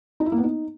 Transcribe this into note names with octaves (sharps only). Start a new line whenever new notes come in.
D#4
E4
A#3
B3
D#4